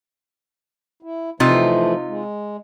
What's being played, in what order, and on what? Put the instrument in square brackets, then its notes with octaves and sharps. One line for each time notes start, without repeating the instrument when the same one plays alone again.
[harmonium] E4
[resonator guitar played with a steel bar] C3 D#4 F4 [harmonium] E3 F3 A3
[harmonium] G#3